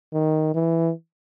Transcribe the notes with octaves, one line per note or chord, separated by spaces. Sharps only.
D#3
E3